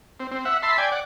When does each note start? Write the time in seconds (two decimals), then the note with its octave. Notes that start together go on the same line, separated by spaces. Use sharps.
0.20 C4
0.31 C4
0.45 E5 F#5
0.63 E5 A5 B5 C6
0.78 D5 G5 G#5
0.92 D5 F#5